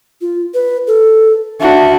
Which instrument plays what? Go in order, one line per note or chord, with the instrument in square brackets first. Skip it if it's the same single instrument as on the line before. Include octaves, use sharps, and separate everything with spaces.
[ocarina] F4
B4
A4
[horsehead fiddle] D4 F#4 [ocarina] E5